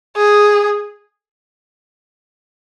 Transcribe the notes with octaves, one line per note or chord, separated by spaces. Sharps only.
G#4